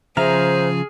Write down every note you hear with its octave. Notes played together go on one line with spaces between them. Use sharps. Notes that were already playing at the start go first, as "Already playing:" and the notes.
C#3 F3 G#4 C5 E5 F5 A#5 F6